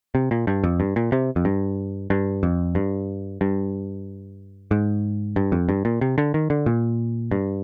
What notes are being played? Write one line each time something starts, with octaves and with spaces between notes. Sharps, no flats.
C3
A#2
G2
F2
G2
A#2
C3
F2
G2
G2
F2
G2
G2
G#2
G2
F2
G2
A#2
C3
D3
D#3
D3
A#2
G2